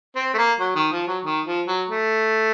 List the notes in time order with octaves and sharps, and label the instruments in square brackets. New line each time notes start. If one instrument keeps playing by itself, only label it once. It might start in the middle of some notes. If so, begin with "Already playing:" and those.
[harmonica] C4
A3
A#3
F#3
D#3
F3
F#3
D#3
F3
F#3
A3